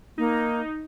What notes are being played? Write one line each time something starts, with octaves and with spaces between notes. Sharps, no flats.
A#3 D#4